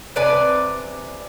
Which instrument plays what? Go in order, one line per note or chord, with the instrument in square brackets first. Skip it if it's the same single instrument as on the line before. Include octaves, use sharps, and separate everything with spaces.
[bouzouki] C3 B4 D5 G#5